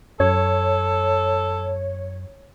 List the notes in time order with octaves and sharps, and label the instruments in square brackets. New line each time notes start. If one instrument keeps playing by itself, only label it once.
[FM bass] F#2 [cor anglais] A4 [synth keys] C#5